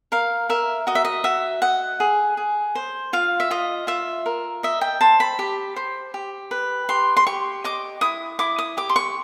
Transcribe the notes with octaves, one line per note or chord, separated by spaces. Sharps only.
A#4 F5
A#4 E5
F#4 D#5
E5
D#5
F#4 E5
D#5 F#5
G#4
G#4
C5
F4 F5
E5
F4 D#5
F4 E5
A#4
D#5 E5
G5
C5 A5
B5
G4
C5
G4
B4
G4 C6
C6
G4 C#6
D#5 D6
E4 D#6
E4 D6
D#6
G4 D6
C6
C#6